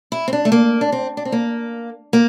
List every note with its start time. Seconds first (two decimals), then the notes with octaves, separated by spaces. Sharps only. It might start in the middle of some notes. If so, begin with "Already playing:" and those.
0.12 E4
0.28 C4
0.33 D4
0.45 A3
0.52 A#3
0.81 D4
0.92 C4
1.17 D4
1.25 C4
1.32 A#3
2.13 A#3